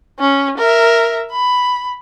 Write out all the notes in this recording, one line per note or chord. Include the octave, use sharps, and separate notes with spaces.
C#4
A#4 E5
B5